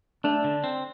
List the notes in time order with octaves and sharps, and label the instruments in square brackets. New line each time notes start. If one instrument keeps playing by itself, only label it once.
[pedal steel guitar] A3 [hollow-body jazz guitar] D4
[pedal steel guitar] D3
C4